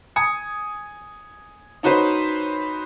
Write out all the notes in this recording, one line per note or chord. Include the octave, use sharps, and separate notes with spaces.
G#5 D#6 C#7
C#4 D#4 F#4 B4 C5